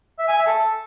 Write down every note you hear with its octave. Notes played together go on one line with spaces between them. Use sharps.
E5
G#5
E5
A4